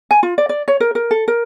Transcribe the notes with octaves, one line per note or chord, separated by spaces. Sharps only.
G#5
F4
D5
D5
C#5
A#4
A#4
A4
A#4